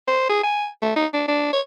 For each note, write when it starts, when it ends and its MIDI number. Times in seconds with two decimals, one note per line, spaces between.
0.08 0.29 72
0.29 0.42 68
0.43 0.67 80
0.82 0.92 57
0.96 1.06 63
1.13 1.26 62
1.28 1.50 62
1.53 1.61 73